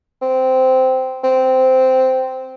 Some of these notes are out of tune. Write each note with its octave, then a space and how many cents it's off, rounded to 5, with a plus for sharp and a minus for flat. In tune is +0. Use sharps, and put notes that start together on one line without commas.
C4 -10
C4 -10